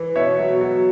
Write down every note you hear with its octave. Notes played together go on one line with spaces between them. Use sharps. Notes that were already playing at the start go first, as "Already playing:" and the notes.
Already playing: E3
B2 C#5 E5
F#3
F#3